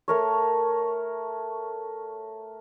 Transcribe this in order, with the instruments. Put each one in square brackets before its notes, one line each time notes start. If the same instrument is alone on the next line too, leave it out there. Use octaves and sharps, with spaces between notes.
[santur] A3 A#4 C#5